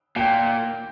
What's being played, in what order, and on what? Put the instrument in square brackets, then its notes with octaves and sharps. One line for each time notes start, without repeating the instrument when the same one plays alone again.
[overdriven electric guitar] A#2 [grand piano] G5